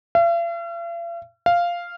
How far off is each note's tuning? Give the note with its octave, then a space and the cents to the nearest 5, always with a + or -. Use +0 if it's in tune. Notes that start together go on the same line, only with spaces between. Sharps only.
F5 -45
F5 -5